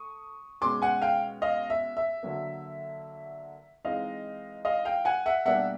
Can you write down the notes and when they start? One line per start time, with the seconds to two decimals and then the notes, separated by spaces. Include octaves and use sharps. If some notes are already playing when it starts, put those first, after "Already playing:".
Already playing: A3 C#6 D#6
0.61 B2 G#3 C#4 C6 D6
0.82 F#5 G#5
1.02 F5 G5
1.42 D#5 F5
1.70 E5
1.97 E5
2.23 D3 F#3 A#3
3.84 E3 G#3 C4 D#4 D#5 F5
4.65 D#5 F5
4.85 F5 G5
5.05 F#5 G#5
5.26 E5 F#5
5.45 B2 G3 A#3 D4 E5 F#5